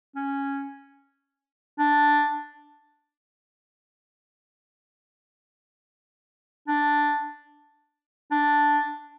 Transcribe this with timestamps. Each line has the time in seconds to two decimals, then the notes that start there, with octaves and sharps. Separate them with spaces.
0.16 C#4
1.79 D4
6.68 D4
8.31 D4